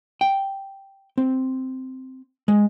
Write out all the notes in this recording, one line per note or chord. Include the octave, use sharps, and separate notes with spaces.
G5
C4
G#3